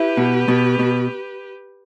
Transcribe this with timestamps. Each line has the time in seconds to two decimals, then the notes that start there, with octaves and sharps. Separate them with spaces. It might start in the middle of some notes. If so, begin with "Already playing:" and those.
Already playing: E4 G4 B4
0.17 B2
0.48 B2
0.79 B2